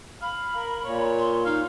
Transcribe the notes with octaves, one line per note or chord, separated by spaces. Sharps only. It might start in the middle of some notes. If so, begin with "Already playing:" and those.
F5 B5
A#4
A#2 C#5
C6
D#4 F5